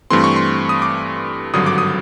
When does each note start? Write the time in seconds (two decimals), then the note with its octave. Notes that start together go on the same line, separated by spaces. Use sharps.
0.10 G2 E3 A3 C4 C6
0.24 C#6
0.36 C6
0.69 D#6
0.82 D6
1.53 G#1 G2 D3 F#3 D#6
1.66 D6
1.78 D#6